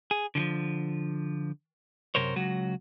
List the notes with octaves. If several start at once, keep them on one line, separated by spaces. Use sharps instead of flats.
G#4
D3 E3 F3
F#2 C3 A#4 C5 C#5
C#2 F#3 F#4